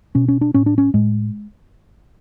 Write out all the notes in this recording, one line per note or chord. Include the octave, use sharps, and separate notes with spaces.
B2 C#4
C#4
D4
A2 C#4
D4
C#4
A2 G#3